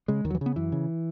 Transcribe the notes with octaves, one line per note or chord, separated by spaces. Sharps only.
C#3 G#3
D#2 D#3
F#3
E3
C#3 B3
F#2 E3
C#3